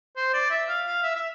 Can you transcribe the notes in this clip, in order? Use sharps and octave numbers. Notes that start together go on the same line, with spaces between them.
C5
D5
E5
F5
F5
E5
E5